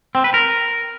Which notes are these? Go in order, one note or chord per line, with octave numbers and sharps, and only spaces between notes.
C4
B4
A#4